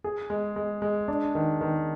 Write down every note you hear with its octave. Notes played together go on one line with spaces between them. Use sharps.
G#4
G#3
G#3
G#3
D4
D#3
D#3